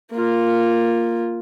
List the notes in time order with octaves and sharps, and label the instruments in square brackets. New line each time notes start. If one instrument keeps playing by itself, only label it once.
[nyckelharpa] A#3 F4